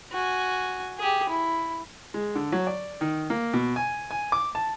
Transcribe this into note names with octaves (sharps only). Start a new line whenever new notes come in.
F#4 G#5
G4 G#4
E4
G#3
D3
F#3
D5
D#3
A#3
B2
G#5
G#5
D6
A5